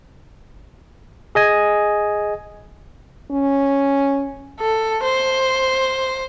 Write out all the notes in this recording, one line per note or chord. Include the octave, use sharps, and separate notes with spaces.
G#4 D#5 G#5
C#4
A4
C5